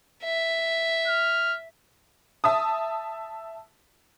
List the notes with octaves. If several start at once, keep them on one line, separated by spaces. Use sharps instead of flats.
E5
F6
E5 A5 D#6